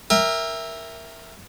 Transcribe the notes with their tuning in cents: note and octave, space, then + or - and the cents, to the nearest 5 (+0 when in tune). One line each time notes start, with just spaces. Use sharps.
A#4 +0 E5 +0 G5 +40